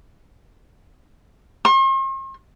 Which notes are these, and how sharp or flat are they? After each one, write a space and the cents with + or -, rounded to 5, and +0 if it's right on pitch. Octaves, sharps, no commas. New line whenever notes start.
C6 +45